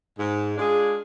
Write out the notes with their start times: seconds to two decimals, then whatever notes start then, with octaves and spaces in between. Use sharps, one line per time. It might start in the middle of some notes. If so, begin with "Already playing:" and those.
0.18 G#2
0.56 G#3 D4 F4 G#4